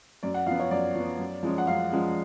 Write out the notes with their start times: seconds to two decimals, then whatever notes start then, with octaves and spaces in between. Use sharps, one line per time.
0.23 F#2 D5
0.34 F#5
0.46 F3 F5
0.51 B3
0.60 C#5
0.71 F#2 D5
0.94 F3 B3
1.19 F#2
1.43 F3 G#3 C#4
1.58 F#5
1.67 F#2 F5
1.92 F3 G#3 C#4